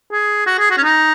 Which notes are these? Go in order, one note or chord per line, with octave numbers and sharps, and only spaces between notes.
G#4
F#4
G#4
F#4
C#4
D#4